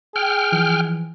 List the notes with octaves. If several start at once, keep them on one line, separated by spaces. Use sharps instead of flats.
G#4 G5 F6
E3 F3